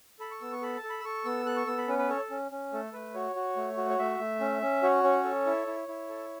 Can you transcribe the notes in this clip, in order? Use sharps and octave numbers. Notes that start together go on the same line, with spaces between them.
A4 B5
C#6
B3 E6
C#6
A4 B5
A5
A4
B5
E6
A4 C#6
B3 E6
A4 F#6
C#6
B3 E6
B5
C#4 B4
B4
A4 C#5
C#4
C#4
A3 A4
A3 B4
F#4 C#5
F#4
A3
F#4
C#5
A3 E5
A3
C#4
C#4
F#4 C#5
C#4
A4
E4
E4
E4
A4